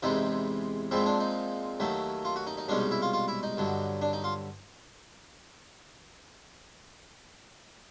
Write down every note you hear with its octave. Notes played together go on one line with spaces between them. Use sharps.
E2 C3 E3 G#3 D#4
A#2 F3 G#3 C4 E4
D4
D#4
D#2 D#3 F#3 A3
F4
F#4
D#4
D#4
C2 B2 G#3 C#4 D4
D#4
E4
F4
F4
E4
D#4
G2 D3 F#3
D4
D#4
F4